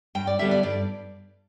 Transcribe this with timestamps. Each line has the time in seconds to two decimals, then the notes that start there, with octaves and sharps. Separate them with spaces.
0.15 G2 G5
0.27 D5
0.39 D3 G3 B3 E5
0.51 D5
0.63 G2 D5